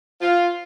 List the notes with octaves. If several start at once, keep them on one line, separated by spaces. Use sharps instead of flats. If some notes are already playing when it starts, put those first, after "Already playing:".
F4